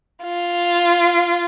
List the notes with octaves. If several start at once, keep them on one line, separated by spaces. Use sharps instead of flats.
F4